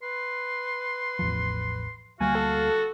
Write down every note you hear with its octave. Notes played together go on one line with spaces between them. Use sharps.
B4 C6
A1 E2 F3
D2 G3 A#3 F#4 F5 G#5
A4